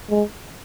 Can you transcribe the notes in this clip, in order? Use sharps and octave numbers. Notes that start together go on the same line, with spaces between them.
G#3